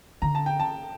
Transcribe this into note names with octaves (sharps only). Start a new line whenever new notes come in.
D3 A#5
A5
G5
A5